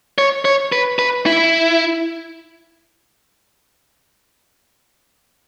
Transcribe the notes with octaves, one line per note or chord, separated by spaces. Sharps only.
C#5
C#5
B4
B4
E4